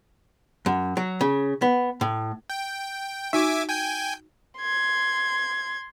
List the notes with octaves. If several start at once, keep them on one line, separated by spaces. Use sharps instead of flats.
F#2
F#3
C#3
B3
A2
G5
D#4 F#4 E5 G#5 D6
G5 G#5 G6
C6 G#6